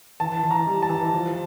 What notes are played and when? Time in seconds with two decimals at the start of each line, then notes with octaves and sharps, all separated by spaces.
0.20 E3 A5
0.43 E3
0.51 A#5
0.67 G3
0.82 A5
0.89 E3
1.13 F3